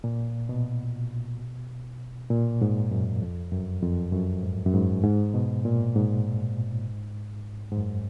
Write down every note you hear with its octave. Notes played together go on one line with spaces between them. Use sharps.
A#2
B2
A#2
G#2
F#2
F2
F#2
F2
F#2
G#2
F#2
G#2
G#2
B2
A#2
G#2
G#2
F#2